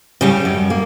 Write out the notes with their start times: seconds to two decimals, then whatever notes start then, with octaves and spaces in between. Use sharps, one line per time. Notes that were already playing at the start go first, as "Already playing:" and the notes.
0.21 C#3 G3 C#4
0.45 F#2
0.70 A#3